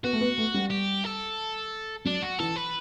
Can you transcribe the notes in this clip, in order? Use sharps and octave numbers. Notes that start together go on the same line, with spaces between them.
B3 F#4
A3
B3
A3
G3
G4
A4
F#3 D4
F#4
E3 A4
B4